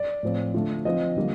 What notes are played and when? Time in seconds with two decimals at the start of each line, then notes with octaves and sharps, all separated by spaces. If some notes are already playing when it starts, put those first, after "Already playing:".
Already playing: D5
0.23 A2 F3 C4
0.54 D3 A3 D4 F4
0.85 F3 C4 F4 D#5
1.16 D3 G3 A#3 F4